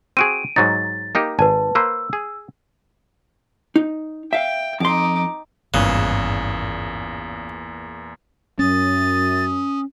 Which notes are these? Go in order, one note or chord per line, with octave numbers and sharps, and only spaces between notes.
C4 F#4 G#4 D7 D#7
G#2 F#3 D#4 A6
A#3 D#4 G4
G#1 B4 G#5 A5
A#3 B4 C5 E6
G#4
D#4
E5 F5 G5
F2 D#4 C6 D6
G#1 E2 G2 A#2 C#3 F#6
F#2 C#4 D#6 A6